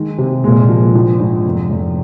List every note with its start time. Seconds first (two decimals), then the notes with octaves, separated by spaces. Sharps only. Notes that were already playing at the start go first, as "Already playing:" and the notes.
Already playing: D#3 G#3
0.18 C3
0.44 A#2 G#3
0.69 F3
0.95 A#1
1.20 G#2
1.45 F1
1.70 F1